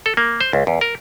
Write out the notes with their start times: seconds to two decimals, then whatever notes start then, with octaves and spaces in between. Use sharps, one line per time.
0.06 A4
0.17 A#3
0.41 C5
0.53 C#2
0.67 E2
0.81 A#4